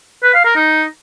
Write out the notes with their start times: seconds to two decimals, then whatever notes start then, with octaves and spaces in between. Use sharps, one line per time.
0.23 B4
0.34 F5
0.45 A#4
0.56 D#4